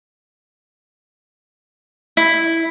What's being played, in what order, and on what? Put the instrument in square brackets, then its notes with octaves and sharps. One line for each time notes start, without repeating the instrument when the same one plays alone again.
[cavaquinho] E4